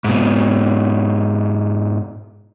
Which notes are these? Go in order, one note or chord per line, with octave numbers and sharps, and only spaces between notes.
G#2 B2